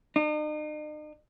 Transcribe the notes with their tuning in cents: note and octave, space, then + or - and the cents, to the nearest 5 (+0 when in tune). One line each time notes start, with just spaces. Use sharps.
D#4 -45